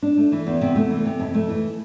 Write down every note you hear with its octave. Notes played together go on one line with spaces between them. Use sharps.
D4
A3
E3
E2
C3
A3
E3
C3
F2
A3
E3